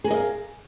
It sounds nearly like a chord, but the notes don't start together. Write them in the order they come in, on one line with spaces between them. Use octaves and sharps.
G#4 A#4 D#5 F5